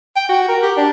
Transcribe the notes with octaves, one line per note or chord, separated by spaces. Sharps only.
G5
F#4
A#4
G4
D4